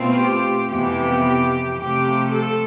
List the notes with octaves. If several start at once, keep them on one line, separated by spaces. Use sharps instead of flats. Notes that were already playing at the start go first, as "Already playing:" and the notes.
Already playing: B2 A3 C4 F4
G4
F2 C3 E3 B3 G4
C3 F3 A3 G4
A4